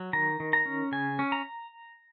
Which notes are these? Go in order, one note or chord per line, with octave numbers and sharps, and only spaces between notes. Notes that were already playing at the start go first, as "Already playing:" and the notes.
Already playing: F#3
D#3 A#5
D#3
A#5
C#4
C#3 G#5
C#4
A#5